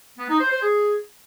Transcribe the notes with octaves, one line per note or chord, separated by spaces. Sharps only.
B3
D#4
C5
C5
G#4